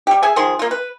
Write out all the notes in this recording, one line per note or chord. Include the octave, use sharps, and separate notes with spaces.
G3 G4
G#4 E5 G#5
D#3 F3 G#4 C6
A#3 F4
B4